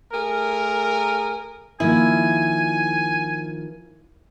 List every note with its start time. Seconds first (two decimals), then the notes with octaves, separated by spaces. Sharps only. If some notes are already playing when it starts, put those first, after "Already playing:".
0.13 A3 G#4 A#4
1.80 D#3 F3 A#3 E4 G#5